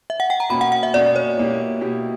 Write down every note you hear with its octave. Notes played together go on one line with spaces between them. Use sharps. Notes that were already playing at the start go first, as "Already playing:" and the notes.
E5
F#5
G5
A#5
B2 A#3 C#4 B5
F#5
F#5
E5
B2 A#3 C#4 D5
C#5
B2 A#3 E4 G4
B2 A#3 E4 G4